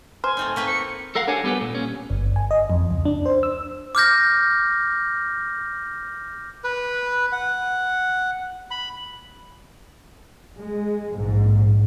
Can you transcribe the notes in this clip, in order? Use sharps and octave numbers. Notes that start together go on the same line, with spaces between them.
C5 G#5 F6
A3 C4 D#4
A#3 C4 B4 C#6 B6
C#7
A4 A#4 F5 F#5
D4 G4 C#5 F5 F#5 G#5
G3 B3 G4 A4 B4
A#2
C#4
G1
G#5
D#5
F2
C#2
D4
C5
E6
D6 F6 G6 A#6
B4
F#5
B5
G#3
A#1 G#2